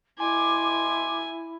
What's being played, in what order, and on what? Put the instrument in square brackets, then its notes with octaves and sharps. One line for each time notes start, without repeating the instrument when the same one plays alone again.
[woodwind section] B2 C6 D6 [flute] E4 [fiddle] G#5